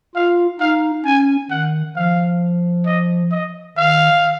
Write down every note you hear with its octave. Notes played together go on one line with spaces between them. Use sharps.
F4 F5
D#4 F5
C#4 G#5
D#3 F#5
F3 F5
D#5
D#5
D#3 F5